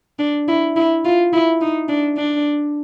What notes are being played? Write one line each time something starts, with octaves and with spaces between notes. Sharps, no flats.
D4
E4
E4
F4
E4
D#4
D4
D4